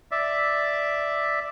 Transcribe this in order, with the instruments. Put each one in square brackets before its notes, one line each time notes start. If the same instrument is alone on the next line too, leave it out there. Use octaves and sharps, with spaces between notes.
[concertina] D5 E5